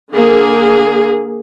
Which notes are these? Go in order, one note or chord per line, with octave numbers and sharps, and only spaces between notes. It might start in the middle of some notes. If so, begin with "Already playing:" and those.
D3 A#3 G#4